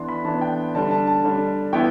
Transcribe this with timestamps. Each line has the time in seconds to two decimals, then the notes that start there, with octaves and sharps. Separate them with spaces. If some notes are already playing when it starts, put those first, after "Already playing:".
Already playing: E3 B3 D4 C6
0.08 B5
0.25 E3 B3 D4 A5
0.41 G5
0.74 D3 G3 D4 A5
0.91 A5
1.07 A5
1.23 D3 G3 D4
1.73 E3 B3 E4 G5